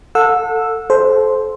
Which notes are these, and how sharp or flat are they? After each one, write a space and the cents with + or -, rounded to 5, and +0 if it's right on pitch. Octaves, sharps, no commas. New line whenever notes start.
A4 +20 F#5 -35 E6 +0
A4 -30 C5 +0